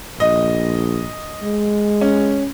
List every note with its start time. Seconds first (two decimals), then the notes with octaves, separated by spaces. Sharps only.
0.20 A#1 D#5
1.43 G#3
2.01 C#4